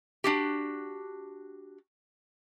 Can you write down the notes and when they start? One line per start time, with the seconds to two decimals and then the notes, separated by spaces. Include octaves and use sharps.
0.24 D4 F#4 G4